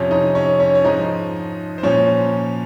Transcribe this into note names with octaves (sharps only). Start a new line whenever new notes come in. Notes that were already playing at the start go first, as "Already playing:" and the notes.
Already playing: F2 C3 F3 C#4 C#5
D#4 D#5
C#4 C#5
C#4 C#5
C#5
G#2 F3 D#4 D#5
C5
A#2 F3 C#4 C#5